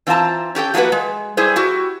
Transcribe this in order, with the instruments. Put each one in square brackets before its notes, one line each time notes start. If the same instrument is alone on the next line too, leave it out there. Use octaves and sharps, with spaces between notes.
[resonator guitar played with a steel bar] E3 C4 F4 F5 A5 A#5
C#4 G4 A4 G5
F3 F#3 A3 A#3 F#4 B4
G#3
G3 E4 G#4 C5
E4 F#4 G4